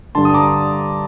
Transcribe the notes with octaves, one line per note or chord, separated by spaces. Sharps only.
G2 D3 A5 C6
D#6
A#5 D6